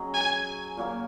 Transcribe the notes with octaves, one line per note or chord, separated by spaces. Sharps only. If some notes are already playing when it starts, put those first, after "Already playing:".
Already playing: F#3 C#4 G#4 D#5
G#5
A#2 F#3 A#3